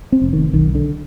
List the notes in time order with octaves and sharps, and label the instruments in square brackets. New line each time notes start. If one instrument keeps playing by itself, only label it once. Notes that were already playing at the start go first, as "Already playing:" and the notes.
[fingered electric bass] C4
F1
D#3
B1 D#3
D3